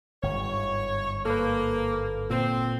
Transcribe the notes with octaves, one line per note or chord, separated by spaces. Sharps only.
G1 G#2 C#5
A#3 A4 B4
A#2 C4